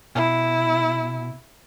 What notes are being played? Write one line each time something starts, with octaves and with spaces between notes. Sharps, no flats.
B2 E4